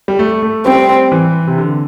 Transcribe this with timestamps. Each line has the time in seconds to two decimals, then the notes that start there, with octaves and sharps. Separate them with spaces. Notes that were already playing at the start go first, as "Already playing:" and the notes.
0.08 G3
0.19 A3
0.42 A3
0.65 G3 C4
1.12 E3
1.47 C3
1.58 D3